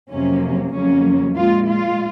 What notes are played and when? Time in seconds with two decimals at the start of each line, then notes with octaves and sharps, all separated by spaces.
0.10 F2 C3 F#3 A#3 C#4
0.73 F2 C#3 F#3 A#3 C#4
1.36 A#2 G#3 F4
1.68 F4